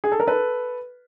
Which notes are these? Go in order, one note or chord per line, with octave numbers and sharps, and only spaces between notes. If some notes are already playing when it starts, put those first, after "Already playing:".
G#4
A4
A#4
A4 B4